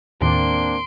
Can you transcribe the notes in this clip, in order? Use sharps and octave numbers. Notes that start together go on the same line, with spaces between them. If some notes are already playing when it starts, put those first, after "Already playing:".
D#2 A2 D#3 A#3 C4 D4 C6 D7